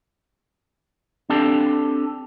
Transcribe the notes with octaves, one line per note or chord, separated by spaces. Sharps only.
C4 D4 G4 A4